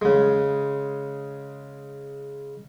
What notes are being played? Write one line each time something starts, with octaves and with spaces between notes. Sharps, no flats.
C#3 G#3